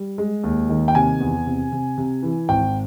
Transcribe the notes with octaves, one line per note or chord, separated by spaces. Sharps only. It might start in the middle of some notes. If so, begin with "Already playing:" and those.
Already playing: G3
G#3
D#2
D#3
G5
C3 G#5
E2
C3
C3
C3
E3
G#1 G5